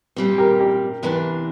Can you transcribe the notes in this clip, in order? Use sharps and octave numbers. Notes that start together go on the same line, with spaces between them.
A#2 G3 C4
G4 A#4
G4 A#4
E2 C3 E3 A#3 D4